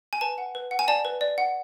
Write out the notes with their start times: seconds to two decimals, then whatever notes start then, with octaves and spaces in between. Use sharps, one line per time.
0.13 G#5
0.21 B4 A5
0.38 F#5
0.55 B4
0.71 F#5
0.79 G#5
0.88 D5 A5
1.05 B4
1.21 D5
1.38 F#5